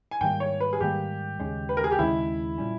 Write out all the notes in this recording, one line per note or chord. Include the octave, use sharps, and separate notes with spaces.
G#5
G#2 D#3 G3 A#3 G5
C#5
B4
G#4
G#2 D#3 G3 A#3 G4
D#2 C#3 G#3 C#4
B4
A#4
G#4
G4
D#2 C#3 G#3 C#4 E4
A#2 G3 C#4